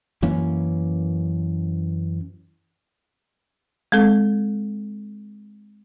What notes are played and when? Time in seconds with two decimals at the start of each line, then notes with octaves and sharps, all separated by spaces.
0.22 F#2 E3 A#3 C#4
3.92 G#3 C4 A4